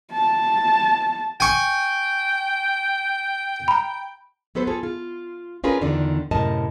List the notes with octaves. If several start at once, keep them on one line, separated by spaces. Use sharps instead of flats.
A5
G5 G#5 C#6
A#5 B5
F#3 B3 A4 B4 C5
F4 G#4 A4
F4
C#4 D4 F4 G#4 A#4 B4
E2 D3 D#3 D4 F4 D5
F#2 A2 C3 A#4 D#5 A5